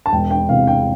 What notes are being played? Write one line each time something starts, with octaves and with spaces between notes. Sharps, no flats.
A5
E1 G5
G5
E2 C3 F5
G5